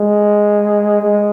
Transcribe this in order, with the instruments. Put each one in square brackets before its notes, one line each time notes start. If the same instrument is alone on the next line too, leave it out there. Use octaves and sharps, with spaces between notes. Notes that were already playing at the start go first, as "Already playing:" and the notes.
Already playing: [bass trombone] G#3
G#3